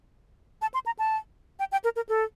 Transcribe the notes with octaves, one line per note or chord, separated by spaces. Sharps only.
A5
C6
A#5
A5
G5
G5
A#4
A#4
A4